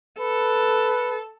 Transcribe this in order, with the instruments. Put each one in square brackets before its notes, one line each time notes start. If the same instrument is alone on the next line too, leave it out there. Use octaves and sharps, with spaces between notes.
[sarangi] A4 [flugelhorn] B4